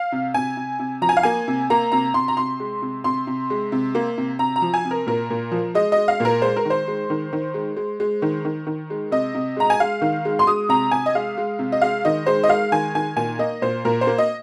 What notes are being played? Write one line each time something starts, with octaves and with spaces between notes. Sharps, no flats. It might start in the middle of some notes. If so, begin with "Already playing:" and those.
Already playing: F5
C3
C3 G#5
C3
C3
F3 A#5
G#5
F5
A#3 G#5
C3
A#3 A#5
C3 A#5
C3 C6
A#5
C3 C6
G#3
C3
C3 C6
C3
G#3
C3
A#3
C3
C3 A#5
A#5
F3
G#5
C3
A#4
A#2 A#4
A#2
F3
G#3 D#5
D#5
G#3
F5
A#2 A#4
G#3 C5
A#4
D#3
C5
G#3
D#3
D#3
G#3
G#3
G#3
D#3
D#3
D#3
G#3
C3 D#5
C3
G#3 A#5
G#5
G#3 F5
D#3
G#3
C6
G#3 D#6
C3 A#5
C3 G#5
D#5
G#3 F5
G#3
C3
D#5
G#3 F5
D#3 D#5
G#3 C5
D#5
G#3 F5
D#3 G#5
D#3 G#5
A#2 G#5
A#3 D#5
A#2 C5
A#2 A#4
C5
A#3
D#5